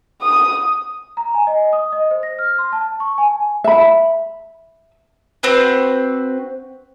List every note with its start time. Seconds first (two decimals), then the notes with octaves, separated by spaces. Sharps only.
0.23 D#6
1.17 A#5
1.34 G#5
1.47 D#5
1.73 D#6
1.92 D#5
2.11 C5
2.23 A#6
2.39 F6
2.58 C6
2.72 A5
3.00 C#6
3.18 G#5
3.64 E5 B5
5.43 C4 F#4 B4 C5